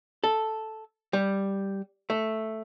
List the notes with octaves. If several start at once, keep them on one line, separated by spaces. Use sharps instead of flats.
A4
G3
A3